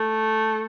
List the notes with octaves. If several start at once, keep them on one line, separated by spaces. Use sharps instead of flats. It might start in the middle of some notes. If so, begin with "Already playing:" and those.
Already playing: A3